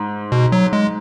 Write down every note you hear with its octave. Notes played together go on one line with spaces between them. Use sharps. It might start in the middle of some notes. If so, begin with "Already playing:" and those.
Already playing: G#2
B2
F#3
G#3